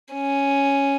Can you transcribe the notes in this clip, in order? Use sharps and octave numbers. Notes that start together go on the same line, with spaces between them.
C#4